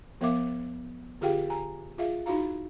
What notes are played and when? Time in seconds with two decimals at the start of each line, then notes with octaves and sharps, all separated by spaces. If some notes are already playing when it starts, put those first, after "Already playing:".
0.21 F3 B3 A#4 E5 F5 D6
1.21 D3 F4 G4 G#4 F5 G5
1.50 G#5 A#5
1.98 F4 G#4 E5 F5
2.26 D#4 E4 F#4 F5 A#5